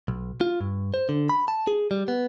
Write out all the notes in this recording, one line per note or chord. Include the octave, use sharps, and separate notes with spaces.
B1
F4
G2
C5
D3
B5
A5
G#4
G3
B3